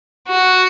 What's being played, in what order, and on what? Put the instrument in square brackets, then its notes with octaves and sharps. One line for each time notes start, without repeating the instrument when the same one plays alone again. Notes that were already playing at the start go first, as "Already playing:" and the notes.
[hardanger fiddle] F#4